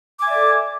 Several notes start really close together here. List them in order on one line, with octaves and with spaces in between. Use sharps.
D6 G#5 E5 D5 A4